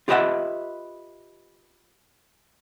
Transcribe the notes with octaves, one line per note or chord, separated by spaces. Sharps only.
F4 G4 B4 D#5 E5 F#5